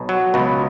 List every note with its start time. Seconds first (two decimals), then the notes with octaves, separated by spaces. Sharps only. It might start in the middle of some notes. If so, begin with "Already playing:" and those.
Already playing: B1 B2
0.09 F#3
0.34 C#2 B2